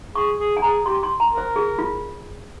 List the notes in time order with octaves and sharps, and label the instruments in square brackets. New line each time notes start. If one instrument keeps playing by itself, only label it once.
[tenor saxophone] G#4 [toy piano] C#6
[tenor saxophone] G#4
[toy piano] G#5
[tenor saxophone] G#4 [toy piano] A#5
[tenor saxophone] G4 [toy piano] C6
[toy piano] C6
A#5
[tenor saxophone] A#4
[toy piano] C5
G#4
F4